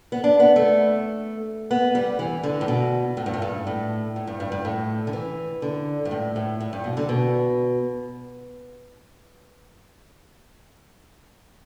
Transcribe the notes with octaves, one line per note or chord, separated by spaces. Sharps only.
B3
D4
B3
A3
B3
G3
E3
D3
A2
B2
A2
G2
A2
G2
A2
A2
G2
G2
G2
A2
D3
E3
D3
G2
A2
A2
A2
G2
B2
D3
B2